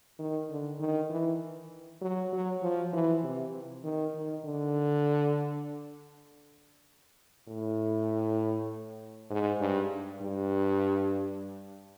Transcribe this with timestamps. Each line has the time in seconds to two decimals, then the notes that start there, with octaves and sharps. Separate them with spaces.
0.19 D#3
0.50 D3
0.80 D#3
1.10 E3
2.01 F#3
2.33 F#3
2.62 F3
2.93 E3
3.24 C3
3.84 D#3
4.15 D#3
4.45 D3
7.48 A2
9.30 G#2
9.61 G2
10.22 G2